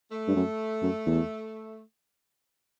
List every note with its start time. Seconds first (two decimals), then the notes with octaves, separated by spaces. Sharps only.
0.12 A3
0.27 G2
0.36 F#2
0.82 F#2
1.06 E2